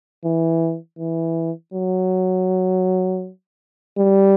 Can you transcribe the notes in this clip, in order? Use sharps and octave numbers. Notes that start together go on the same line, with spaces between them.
E3
E3
F#3
G3